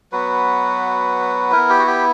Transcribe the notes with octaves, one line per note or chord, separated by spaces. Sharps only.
F#3 B3 F#4 B4
B3 E4 A#4
G4
F#4
G4